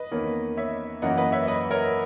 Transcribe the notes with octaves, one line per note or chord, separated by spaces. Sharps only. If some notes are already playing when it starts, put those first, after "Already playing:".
Already playing: B4 D#5
E2 D#3 A#3 C#4
C#5 E5
F#2 E3 A#3 C#4 D#5 F#5
B4 D#5
C#5 E5
B4 D#5
A#4 C#5